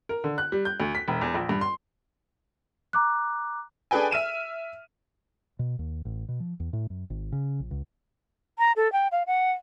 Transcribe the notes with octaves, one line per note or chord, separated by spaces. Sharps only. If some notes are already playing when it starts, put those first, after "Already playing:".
A#4
D3
F#6
G3
G6
D2
B6
E1
E2
A#1
G2
C6
A#5 D6 F#6
D4 G#4 A4 B4 G5 G#5
E5 F6 D#7 E7
B2
D#2
A1
B2
F3
E2
A2
F#2
G#1
C#3
A#1
C#2
A#5
A4
G5
F5
F#5